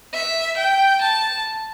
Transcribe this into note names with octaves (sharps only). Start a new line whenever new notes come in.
E5
G5
A5